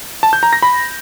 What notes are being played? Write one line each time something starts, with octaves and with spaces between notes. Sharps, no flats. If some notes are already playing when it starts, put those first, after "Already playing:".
A5
G6
A#5
A#6
B5